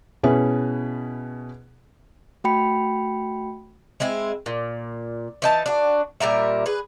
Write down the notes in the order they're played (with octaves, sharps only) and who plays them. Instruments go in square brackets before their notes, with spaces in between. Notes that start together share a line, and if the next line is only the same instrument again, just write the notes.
[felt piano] B2 C#4 E4 G#4 B4
[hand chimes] A3 F#4 G5 B5 C#7
[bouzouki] G#3 C4 E4
A#2
E3 D#4 A5
D4 F#4
A#2 G3 A#4 E5
G#4 B4